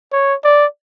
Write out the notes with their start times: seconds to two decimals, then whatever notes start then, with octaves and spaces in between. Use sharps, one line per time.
0.12 C#5
0.44 D5